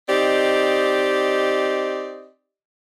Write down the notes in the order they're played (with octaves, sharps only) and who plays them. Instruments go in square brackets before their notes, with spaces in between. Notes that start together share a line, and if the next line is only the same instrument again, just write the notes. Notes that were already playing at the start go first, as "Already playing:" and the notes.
[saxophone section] C4 D#4 G4 D5 D#5